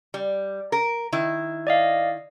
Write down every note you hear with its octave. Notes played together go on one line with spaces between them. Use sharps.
G3
A#4
D#3 E4
D5 D#5 F5